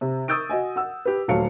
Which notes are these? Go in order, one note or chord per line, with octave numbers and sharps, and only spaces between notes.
C3
C#6 D#6 E6 G6 A6 D7
F#4 D#5 G#5
F#5 E6
G4 B4
D#1 D2 F#3 A4 F5 C#7